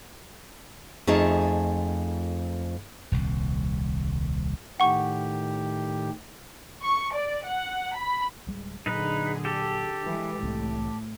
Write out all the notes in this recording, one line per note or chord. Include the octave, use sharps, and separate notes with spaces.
F2 A3 D#4 F4 G#4 A5
D#1 C2
A2 D#3 G4 F#5 C#6
C#6
D5
F#5
B5
D1 G3 G#3
A#2 D3 F#3 D#4 G#4 B4
G4 A4
E3 G#3
C2 A2 E3 C4